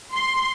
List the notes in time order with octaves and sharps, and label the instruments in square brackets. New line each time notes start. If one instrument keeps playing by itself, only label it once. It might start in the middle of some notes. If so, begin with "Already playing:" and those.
[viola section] C6